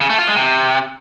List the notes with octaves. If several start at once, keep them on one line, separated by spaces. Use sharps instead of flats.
C#3
A3
F4
G#3
C3